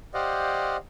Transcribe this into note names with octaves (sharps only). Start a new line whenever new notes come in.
G4 C5 D5 D#5 F5 F#5